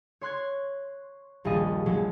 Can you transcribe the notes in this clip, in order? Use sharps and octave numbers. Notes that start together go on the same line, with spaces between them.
C#5 C6 F#6 G#6
D#1 A#1 G3 D#5
A#1 F#3 G#3